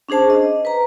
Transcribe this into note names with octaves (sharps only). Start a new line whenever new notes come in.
C#4 D4 G#4 C5 A5
D#5
B4 A#5